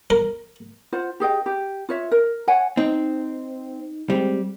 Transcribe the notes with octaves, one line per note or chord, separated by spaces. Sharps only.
A#4
F4 C5 F#5
G4 G#4 D#5 G5
G4
F4 C#5 E5
A#4
C#5 F#5 G#5
C4 D#4
G3 G#3 C4